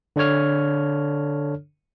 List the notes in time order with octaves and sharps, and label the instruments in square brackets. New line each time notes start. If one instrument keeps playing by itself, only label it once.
[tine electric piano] D3 D4 A4 C#5 F6